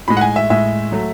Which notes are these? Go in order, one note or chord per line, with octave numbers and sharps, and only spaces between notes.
A2 G#3 B5
F#5
G#5
E5
A2 G#3 E5
F#3 A3